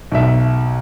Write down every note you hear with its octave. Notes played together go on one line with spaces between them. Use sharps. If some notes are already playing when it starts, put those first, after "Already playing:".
B1 E5